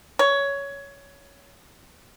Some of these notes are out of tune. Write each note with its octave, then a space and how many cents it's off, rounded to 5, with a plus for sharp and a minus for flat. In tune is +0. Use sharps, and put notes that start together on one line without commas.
C#5 +15